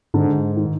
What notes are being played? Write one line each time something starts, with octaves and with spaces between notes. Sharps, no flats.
G#2 D3
D#3